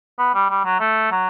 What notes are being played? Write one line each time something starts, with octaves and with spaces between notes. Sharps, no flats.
B3
G3
G3
F#3
A3
F#3